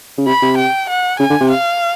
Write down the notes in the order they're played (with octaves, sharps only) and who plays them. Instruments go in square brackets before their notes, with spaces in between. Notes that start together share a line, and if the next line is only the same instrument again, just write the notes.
[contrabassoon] C#3
[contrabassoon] C3 [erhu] B5
[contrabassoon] C3
[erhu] G5
F#5
[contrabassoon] C#3 [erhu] G#5
[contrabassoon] D3
C3
[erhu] F5